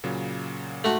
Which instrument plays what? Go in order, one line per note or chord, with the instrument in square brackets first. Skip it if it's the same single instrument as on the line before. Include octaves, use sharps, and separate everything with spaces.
[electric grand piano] A#2 C#3 F#3
[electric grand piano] G#2 [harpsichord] A3 F#4